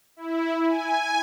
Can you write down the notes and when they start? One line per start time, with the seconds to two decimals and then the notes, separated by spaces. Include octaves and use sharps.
0.16 E4
0.66 G#5